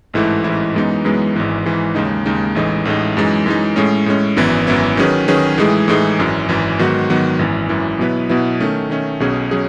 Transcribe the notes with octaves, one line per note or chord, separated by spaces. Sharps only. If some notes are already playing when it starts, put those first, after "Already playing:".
A1 G#2 E3 A3 E4
A1 G#2 E3 A3 E4
F#2 E3 G#3 B3 D#4
F#2 E3 G#3 B3 D#4
G#1 G#2 E3
G#1 G#2 E3
D#2 C#3 G#3 D#4
D#2 C#3 G#3 D#4
A1 A2 E3 G#3 D#4
A1 A2 E3 G#3 D#4
F#2 E3 G#3 D#4
F#2 E3 G#3 D#4
A2 G#3 C#4
A2 G#3 C#4
G#1 F#2 E3 B3 E4
G#1 F#2 E3 B3 E4
D#3 F#3 C#4 G#4 B4
D#3 F#3 C#4 G#4 B4
A2 E3 G#3 D#4 G#4
A2 E3 G#3 D#4 G#4
G#1 F#2 E3
G#1 F#2 E3
G#2 D#3 F#3 B3 F#4
G#2 D#3 F#3 B3 F#4
G#1 F#2 E3
G#1 F#2 E3
B2 F#3 B3 E4 B4
B2 F#3 B3 E4 B4
D#3 A3 C#4
D#3 A3 C#4
B1 B2 F#3 C#4 G#4
F#3 C#4 G#4